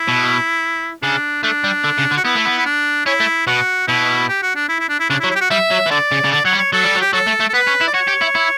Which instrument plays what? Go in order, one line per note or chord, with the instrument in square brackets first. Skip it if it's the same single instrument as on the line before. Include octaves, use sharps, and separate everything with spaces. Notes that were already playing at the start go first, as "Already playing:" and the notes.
Already playing: [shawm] E4
[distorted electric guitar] B2
[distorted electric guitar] C#3 [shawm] D4
[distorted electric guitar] A3 [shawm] D4
[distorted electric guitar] G3
D3
C#3
D3
[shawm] F#4
[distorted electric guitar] B3 [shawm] E4
[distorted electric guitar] A3
B3
[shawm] E4
D4
[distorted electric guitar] C#4 [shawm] E4
[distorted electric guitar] A3
[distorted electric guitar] B2 [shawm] F#4
[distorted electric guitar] B2 [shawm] E4
[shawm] G4
F#4
D4
E4
E4
D4
E4
[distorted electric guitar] C#3 [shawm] D4
[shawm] E4
[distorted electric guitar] F#3
[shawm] E4
G4
F#4
[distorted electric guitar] G3 [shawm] E5
[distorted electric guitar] F#3
E3
[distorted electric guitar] D3 [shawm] D5
[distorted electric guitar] C#3
C#3
[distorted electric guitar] D3 [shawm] D5
[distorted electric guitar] F#3 [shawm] C#5
[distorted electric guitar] G3
[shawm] C#5
[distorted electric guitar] F#3 [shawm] A4
[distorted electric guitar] G3
F#3
[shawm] G4
[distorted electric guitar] F#3 [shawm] A4
[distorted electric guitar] A3
A3
[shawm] A4
[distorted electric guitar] B3 [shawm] B4
[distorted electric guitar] C#4
E4
[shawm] D5
[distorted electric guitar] F#4 [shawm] C#5
[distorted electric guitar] G4
E4
E4